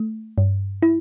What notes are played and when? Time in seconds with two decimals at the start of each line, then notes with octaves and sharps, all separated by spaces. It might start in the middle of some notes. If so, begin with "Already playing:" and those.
Already playing: A3
0.38 G2
0.83 E4